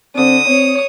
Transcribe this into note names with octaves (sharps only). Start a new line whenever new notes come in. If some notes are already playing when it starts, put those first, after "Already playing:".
D3 C4 D#6
C4 C#5